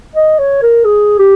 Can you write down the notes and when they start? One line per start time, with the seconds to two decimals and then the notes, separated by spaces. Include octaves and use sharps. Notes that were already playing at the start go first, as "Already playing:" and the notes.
0.16 D#5
0.38 C#5
0.62 A#4
0.85 G#4
1.19 G4